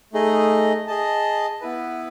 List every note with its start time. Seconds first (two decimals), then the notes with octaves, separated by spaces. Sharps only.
0.13 A3 D#4 G#4 D#5
0.88 G#4 D#5 A5
1.61 B3 E4 B4